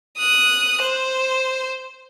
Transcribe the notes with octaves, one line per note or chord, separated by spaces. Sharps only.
D#6 F#6
C5